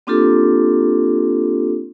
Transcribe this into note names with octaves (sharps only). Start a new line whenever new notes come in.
A#3 C4 D4 F4 G4 A4